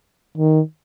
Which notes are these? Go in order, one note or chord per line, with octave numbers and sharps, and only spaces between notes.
D#3